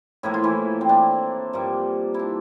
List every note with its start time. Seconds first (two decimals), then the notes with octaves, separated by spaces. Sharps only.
0.23 A2 F3 A#3 E4
0.34 F4
0.44 E3 E4
0.81 C4
0.89 D4
1.53 G2 F3 A#3
2.14 D4 E4